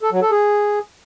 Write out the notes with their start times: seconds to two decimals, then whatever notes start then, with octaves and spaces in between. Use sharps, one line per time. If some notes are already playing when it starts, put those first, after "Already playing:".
0.02 A4
0.12 F#3
0.22 A4
0.31 G#4